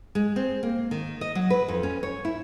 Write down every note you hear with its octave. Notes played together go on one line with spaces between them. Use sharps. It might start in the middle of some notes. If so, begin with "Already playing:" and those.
G#3
C4
A#3
D#3
D#5
F#3
B4
F2
C#4
C#5
E4